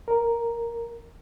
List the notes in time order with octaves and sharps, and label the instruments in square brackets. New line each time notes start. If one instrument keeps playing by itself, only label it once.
[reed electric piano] A#4